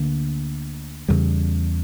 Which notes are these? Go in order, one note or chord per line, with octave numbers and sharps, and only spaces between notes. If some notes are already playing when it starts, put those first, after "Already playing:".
Already playing: D2 D3 A#3
E2 C#3 G3